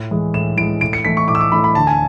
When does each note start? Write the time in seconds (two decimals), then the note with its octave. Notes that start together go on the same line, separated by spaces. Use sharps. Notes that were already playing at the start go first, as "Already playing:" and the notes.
Already playing: A2
0.11 E3 G#3
0.34 A2 E7
0.57 E3 G#3 D7
0.81 A2 D7
0.93 C#7
1.05 E3 A3 E4 B6
1.17 C#6
1.28 A2 D6
1.35 E6
1.41 D6
1.52 E3 A3 E4 B5
1.64 B5
1.75 D2 A5
1.87 G#5